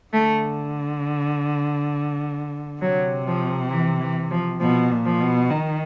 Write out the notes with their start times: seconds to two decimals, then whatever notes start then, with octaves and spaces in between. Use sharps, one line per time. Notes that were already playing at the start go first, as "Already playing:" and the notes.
0.14 D3 A3
2.82 C3 F#3
3.27 F3
3.71 E3
4.01 E3
4.31 F3
4.61 B2 F3
4.92 A#2
5.06 F3
5.20 B2
5.51 D#3